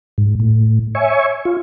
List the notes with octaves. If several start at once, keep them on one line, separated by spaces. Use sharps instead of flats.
G#2
A2
C#5 E5 G#5 C#6
F4